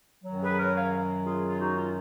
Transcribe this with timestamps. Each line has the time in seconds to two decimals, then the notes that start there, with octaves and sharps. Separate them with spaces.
0.24 F#2 D#3 F#3
0.41 G#4 B4
0.58 A#4 C#5
0.74 C#5 F5
1.25 F4 G#4
1.48 F4
1.59 D#4 F#4
1.76 F4